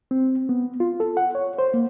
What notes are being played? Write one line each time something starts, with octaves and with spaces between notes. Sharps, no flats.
C4
B3
F4
A4
F#5
C#5
C5
A#3